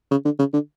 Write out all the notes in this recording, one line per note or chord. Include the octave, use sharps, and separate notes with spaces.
C#3
D3
C#3
D3